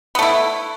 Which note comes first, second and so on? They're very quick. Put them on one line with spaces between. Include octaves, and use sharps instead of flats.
B3 A3 E4